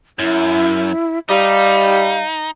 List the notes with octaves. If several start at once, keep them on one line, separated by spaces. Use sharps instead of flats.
F#2 E4
G3 D#4 F5